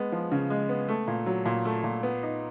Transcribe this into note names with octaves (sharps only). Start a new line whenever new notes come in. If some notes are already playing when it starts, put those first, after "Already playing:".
Already playing: G#3 B3
F3
C#3
G#3
B3
A3
A#2
F#3
A#2
A3
A#2
B3
D#4